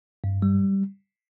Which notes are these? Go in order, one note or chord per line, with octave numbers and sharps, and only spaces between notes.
G2
G3